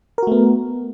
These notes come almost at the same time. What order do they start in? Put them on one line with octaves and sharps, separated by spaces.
A#4 F#4 A3 B3